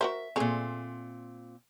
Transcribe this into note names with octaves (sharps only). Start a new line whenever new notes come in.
F#4 A#4 C5 E5
A#2 A3 C4 G#4